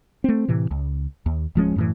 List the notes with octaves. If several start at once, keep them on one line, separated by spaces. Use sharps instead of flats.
A3 C4
A2 C3 E3
C#2
D#2
D1 F3 G#3 C#4
F#2 A2 E3